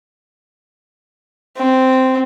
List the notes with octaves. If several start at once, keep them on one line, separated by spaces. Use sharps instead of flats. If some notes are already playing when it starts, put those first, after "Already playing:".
C4